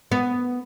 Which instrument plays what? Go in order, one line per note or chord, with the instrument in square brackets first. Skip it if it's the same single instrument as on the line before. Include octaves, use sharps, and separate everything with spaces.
[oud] B3